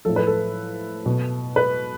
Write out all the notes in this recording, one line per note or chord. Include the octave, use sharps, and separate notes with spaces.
A2 F3 A4
B4
A4
B2
B4